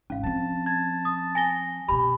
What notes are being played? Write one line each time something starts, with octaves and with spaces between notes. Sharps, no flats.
G#1 G2 C#4 F5
F3 C4 A5
A5 G#6
D#6
G#5 A#6 G7
F#2 B2 G4 B5